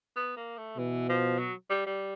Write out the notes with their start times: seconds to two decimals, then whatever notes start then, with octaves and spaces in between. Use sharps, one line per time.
0.16 B3
0.36 A#3
0.58 A3
0.77 B2 E3
1.09 F3
1.39 F#3
1.70 G3
1.86 G3